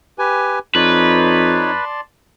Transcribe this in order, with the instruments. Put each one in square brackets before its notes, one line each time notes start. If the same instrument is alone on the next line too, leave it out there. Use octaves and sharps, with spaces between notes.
[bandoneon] G4 B4 G#5
[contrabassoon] F2 [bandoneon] D#4 C#5 [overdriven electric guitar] B4 [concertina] D5 A5 C6